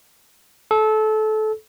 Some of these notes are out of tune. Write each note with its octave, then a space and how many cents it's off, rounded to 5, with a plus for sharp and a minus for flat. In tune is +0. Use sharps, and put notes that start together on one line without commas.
A4 -25